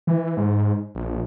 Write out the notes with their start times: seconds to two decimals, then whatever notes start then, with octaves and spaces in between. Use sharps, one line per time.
0.07 E3
0.37 G#2
0.95 A#1